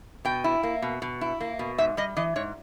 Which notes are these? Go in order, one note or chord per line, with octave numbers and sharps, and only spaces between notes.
B2 G5
E4
A#3
B2
B2
E4
A#3
B2
G#2 E5
G3 D#5
E3 D#5
G#2 C#5